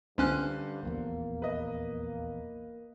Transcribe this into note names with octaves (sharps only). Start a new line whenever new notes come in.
C#2 G2 D3 C#4 C5 F#6
D#1 A#1 E2 A#3
B4 D#5